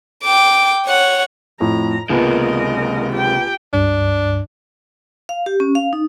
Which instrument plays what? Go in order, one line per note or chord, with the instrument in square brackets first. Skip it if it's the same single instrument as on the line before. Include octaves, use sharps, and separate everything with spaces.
[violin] G5 D6
C#5 F#5
[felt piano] F2 A2 [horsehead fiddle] A#5
[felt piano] C#2 A#3 B3 [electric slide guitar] C3 G#3 [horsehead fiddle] A#4 D#5
[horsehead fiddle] G4 G5
[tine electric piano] C#2 G2 [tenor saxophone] D4
[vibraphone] F5
G4
C#4
F5
D#4